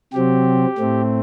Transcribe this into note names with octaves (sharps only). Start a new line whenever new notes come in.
C3 F#3 C4 G4
A2 A3 C4